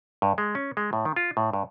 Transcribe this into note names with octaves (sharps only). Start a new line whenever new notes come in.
G2
G#3
C#4
G#3
A2
D#3
F4
A2
G2